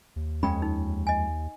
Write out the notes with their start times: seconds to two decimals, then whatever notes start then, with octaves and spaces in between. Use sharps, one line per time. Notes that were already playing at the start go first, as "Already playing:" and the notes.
0.16 D#2
0.43 F2 G#3 C#4 G5 B5
0.62 D#4
1.07 D#5 G#5